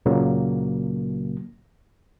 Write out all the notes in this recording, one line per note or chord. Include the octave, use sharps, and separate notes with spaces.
C#2 A#2 C#3 F#3 A#3